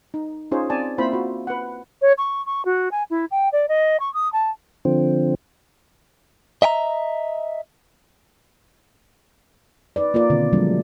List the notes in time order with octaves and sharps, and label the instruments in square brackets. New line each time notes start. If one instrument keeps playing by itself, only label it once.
[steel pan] D#4
C#4 D#4 F4 G#4 C5 C#5
C4 D5 G#5 A5
A#3 C4 E4 F4 C5 B5
F4 F#4
B4 F#5
[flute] C#5
C#6
C#6
F#4
G#5
E4
G5
D5
D#5
C#6
D#6
A5
[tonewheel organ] D3 F3 C4
[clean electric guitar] D#5 E5 G5 A#5
[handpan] D#4 B4 D5
A#3 F4 A#4 D5
B2 D3 D#3 C4 F4
F3 F#3 G#3 A3 D4